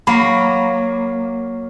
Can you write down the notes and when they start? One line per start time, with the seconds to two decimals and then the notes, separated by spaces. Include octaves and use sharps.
0.07 F#3 A#3 B5